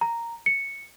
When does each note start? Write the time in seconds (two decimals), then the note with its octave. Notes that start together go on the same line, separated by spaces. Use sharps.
0.01 A#5
0.46 C#7